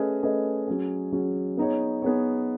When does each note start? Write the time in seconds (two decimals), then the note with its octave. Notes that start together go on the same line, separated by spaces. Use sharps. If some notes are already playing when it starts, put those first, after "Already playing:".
Already playing: A3 C#4 G#4 B4 D#5
0.23 A3 C#4 G#4 B4 D#5
0.68 F#3 C#4 G#4
1.12 F#3 C#4 G#4
1.57 B3 D#4 G#4 C#5
2.02 B3 D#4 G#4 C#5